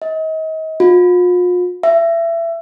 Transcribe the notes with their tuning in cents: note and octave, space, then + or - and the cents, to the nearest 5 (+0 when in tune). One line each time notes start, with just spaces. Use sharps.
D#5 +35
F4 +40
E5 +25